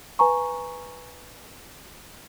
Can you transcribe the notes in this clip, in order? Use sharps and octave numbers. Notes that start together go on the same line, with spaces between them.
B4 G#5 A#5 C#6